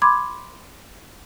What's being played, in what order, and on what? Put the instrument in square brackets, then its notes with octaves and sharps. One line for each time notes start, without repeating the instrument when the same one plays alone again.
[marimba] B5 C6 D6 G#6